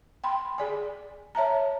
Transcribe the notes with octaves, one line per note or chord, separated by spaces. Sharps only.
G5 B5 C6
G#4 D5 G#5
C#5 E5 A5 A#5